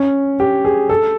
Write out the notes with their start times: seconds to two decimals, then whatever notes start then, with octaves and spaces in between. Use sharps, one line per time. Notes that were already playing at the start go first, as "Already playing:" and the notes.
Already playing: C#4
0.40 G4
0.65 G#4
0.89 A4